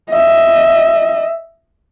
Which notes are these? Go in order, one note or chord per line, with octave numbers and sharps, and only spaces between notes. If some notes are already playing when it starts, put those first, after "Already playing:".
D#5 E5